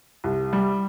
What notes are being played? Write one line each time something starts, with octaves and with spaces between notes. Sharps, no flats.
C2
G3